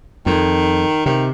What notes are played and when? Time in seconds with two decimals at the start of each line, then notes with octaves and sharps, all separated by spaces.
0.26 F2 D#3
1.06 C3 D#3